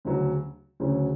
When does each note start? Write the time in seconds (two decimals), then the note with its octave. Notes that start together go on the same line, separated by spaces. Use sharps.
0.05 D2 C#3 F#3 C#4
0.80 D2 C#3 F#3 C#4